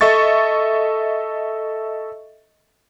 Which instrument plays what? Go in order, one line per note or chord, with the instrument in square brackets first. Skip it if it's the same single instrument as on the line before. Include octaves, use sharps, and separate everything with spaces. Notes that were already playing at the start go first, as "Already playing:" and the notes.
[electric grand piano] A4 D#5 E5 C#6 A6